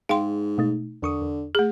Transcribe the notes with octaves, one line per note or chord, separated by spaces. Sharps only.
G#2 G#4 F5 G5 C6
B2 A3 D#4
E2 D3 C#6 D#6
E2
A3 G#4